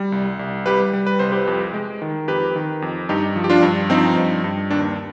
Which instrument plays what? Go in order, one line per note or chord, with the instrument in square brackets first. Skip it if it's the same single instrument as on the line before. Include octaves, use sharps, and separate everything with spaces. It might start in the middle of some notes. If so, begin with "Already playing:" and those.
Already playing: [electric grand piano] G3
C2
C2
G3 G4 B4
G3
B4
C2 C5
G4 B4
F2
G#3
D#3
F2 G4 B4
D#3
F2
G2 D#4 G4
F3
G4
D4 F4
G2
F3 C4 D#4
G2
G2
D#2 D4